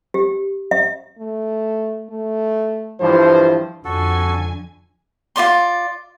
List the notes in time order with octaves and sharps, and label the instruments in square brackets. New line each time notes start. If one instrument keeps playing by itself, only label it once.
[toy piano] G4
E5
[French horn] A3
A3
[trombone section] G2 E3 F3 [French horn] C5
[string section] F2 D3 G#5 [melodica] F#4 A4
[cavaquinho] F4 F#4 D5 C6